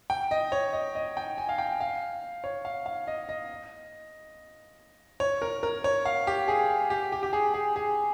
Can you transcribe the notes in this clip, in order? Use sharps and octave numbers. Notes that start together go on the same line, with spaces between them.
G5
D#5
C#5
D#5
D#5
G5
G#5
F5
G5
F5
C#5
F5
F5
D#5
D#5
C#5
A#4
A#4
C#5
F5
G4
G#4
G4
G4
G4
G#4
G#4
G#4